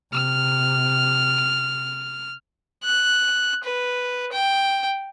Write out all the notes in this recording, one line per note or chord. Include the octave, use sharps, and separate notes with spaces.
C3 F6
F#6
B4
G5